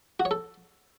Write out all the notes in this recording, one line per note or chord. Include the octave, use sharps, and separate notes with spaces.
F#4
C#5
A4